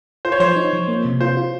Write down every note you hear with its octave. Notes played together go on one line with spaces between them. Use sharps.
F4 C5
C#5
F3 C5
D#4
F3
A#3
C3
F4 C5
F4